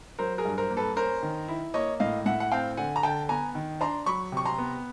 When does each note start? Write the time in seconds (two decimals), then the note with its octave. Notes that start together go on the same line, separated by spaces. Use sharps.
0.19 F#3 A#4 C5
0.38 G#4 A#4
0.45 G2
0.58 A#4 C5
0.71 A#3
0.77 A4 B4
0.96 C#4 A#4 C5
1.22 D#3
1.48 E4
1.74 A#3 C#5 D#5
2.00 A2 D#5 F5
2.26 A2 E5 F#5
2.40 F#5
2.52 C4 F5 G5
2.77 D3 F#5 G#5
2.96 A#5
3.03 D3 G5 A5
3.29 B3 G#5 A#5
3.55 D#3
3.81 D4 A#5 C6
4.06 F#3 B5 C#6
4.32 C3 C#6
4.45 A#5 C6
4.58 B3